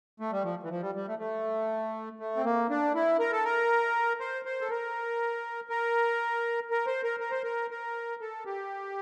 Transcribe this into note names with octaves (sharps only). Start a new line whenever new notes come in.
A3
G3
F3
E3
F3
G3
G3
A3
A3
A3
C4
A#3
D4
E4
A#4
A4
A#4
C5
C5
A4
A#4
A#4
A#4
C5
A#4
A#4
C5
A#4
A#4
A4
G4